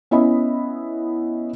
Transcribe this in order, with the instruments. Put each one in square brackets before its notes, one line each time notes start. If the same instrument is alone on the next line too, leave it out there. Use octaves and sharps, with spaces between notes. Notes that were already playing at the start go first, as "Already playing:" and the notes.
[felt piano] B3 C#4 E4 D#5 E5 B5